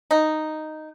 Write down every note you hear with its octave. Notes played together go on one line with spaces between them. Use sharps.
D#4